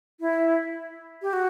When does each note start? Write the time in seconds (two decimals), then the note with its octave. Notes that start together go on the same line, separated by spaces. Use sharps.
0.20 E4
1.22 G4
1.33 F#4